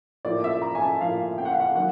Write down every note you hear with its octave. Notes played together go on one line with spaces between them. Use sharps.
A2 F3 A#3 D5
E5
A#5
G#5
A5
A2 F3 A#3 F5
G5
F#5
F5
F#5
D#3 F#3 A#3 F#5